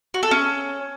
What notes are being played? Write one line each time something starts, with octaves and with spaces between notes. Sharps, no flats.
F#4
A4
C#4